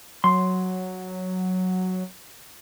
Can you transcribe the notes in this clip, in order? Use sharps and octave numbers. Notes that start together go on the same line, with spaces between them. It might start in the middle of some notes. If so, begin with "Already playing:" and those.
F#3 C6